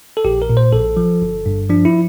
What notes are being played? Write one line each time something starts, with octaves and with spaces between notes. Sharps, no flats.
A4
A#1 G4
A#4
A#2
C5
A#1 A4
F3
G1
G2
F3 D4
E4